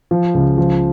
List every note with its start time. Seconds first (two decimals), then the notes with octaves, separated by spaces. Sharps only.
0.11 F3
0.34 C#2
0.58 F3